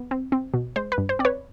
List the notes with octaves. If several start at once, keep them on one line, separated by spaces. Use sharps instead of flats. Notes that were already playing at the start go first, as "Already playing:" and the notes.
Already playing: B3
C4
C4
B2
G#3 C5
B4
G2
C5
C4 D5
B4 C#5